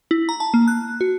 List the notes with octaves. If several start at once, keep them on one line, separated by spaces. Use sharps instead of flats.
E4
A#5
A5
A#3
F#6
F#4